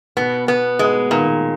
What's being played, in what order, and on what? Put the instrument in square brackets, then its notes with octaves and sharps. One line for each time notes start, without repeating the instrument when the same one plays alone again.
[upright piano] B2 [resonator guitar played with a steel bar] B3
[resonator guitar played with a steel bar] B3
[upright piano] B2 [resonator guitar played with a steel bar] G#3
[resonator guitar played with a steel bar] A#2 [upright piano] D#3